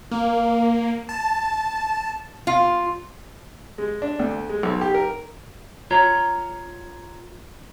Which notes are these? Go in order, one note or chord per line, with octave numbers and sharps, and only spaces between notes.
A#3
A5
F4
G#3
D4
D2
G#3
B1
G4
A#4
F4 C#5 A#5